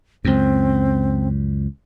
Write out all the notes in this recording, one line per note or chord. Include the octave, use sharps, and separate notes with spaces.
C#2 F#2 C4